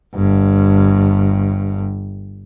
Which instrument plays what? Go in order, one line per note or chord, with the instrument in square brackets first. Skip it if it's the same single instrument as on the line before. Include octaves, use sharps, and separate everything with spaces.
[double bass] G1 G2